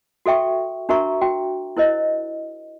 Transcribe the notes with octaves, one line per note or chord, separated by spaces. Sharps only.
F#4 A4 E5 G5 C#6
D4 F#4 A#4 E5 A#5 C#6
F#4 G5
E4 A#4 C5 D#5